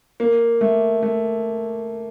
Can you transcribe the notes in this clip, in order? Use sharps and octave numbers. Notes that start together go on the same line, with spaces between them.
A#3
A3
A3